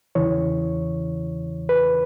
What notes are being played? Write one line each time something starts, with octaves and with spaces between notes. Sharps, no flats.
E2 C#3 E3 C#5
B4